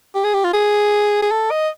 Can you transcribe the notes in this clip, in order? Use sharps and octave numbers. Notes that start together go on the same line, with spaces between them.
G4
G#4
G4
F4
G#4
G#4
A4
D#5